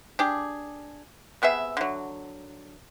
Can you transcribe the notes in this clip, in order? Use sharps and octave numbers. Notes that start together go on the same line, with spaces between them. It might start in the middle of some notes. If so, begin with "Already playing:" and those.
D4 G4 G#4
C3 B3 G#4 E5
D3 F#3